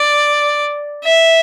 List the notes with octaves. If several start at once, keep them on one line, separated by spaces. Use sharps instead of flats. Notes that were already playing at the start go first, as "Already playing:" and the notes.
Already playing: D5
E5